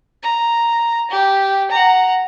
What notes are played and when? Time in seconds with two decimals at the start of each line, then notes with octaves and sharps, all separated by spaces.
0.23 A#5
1.10 G4
1.71 F#5 A#5